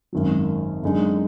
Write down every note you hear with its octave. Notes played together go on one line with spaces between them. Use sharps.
G#1 F#2 D#3 F#3
F#2 D3 G#3 D#4